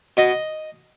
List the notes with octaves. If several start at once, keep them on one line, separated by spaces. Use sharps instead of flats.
B2 D#5